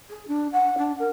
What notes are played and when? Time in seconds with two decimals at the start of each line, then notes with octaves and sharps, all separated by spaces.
0.10 G#4
0.28 D4
0.52 F#5
0.78 D4
0.99 A#4